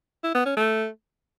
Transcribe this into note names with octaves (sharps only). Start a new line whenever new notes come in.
E4
B3
C#4
A3